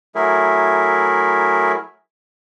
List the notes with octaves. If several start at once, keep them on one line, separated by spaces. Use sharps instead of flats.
F#3 A3 E4 G#4 A#4 E5